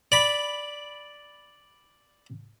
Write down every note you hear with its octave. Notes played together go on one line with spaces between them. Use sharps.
D5 B5